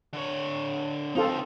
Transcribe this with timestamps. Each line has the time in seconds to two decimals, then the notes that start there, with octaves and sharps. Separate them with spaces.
0.13 D3 C#5
1.15 C#2 C4 D#4 F4 A4